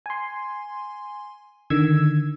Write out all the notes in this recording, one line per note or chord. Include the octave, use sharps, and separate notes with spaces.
G#5 C6
D3 D#3 E6 G#6